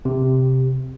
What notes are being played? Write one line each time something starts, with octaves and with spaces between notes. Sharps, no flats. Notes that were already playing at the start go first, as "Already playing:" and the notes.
C3